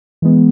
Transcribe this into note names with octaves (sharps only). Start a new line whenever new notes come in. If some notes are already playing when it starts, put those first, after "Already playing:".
E3 G#3 B3